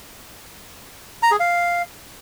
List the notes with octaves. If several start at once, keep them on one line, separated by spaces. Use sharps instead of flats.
A#5
G#4
F5